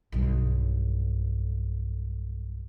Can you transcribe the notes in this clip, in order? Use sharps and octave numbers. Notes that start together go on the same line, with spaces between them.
B1 G2